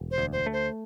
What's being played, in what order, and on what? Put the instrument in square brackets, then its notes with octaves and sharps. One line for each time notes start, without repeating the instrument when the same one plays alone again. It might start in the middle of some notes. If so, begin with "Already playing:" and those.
Already playing: [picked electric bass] E1
[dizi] C5
[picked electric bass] D2
[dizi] C5
[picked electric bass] A3
[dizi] C5